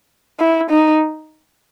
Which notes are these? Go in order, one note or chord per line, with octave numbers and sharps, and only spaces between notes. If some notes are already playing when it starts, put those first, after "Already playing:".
E4
D#4